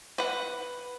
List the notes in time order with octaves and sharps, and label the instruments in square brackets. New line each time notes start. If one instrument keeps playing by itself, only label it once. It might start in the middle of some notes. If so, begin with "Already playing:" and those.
[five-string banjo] B4 F#5